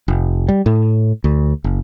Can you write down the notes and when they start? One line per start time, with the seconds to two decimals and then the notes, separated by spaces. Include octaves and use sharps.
0.08 F1
0.48 G3
0.66 A2
1.24 D2
1.64 F#1